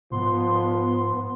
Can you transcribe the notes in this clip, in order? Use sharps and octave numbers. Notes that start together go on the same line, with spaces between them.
G#2 F3 B3 C6